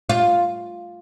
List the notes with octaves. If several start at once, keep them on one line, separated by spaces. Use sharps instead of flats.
F4